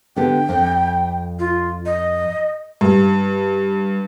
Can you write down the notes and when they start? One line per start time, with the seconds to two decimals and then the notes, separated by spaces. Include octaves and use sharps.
0.16 D3 B3 G4 G5
0.49 F2
1.39 F4
1.86 D#5
2.81 G2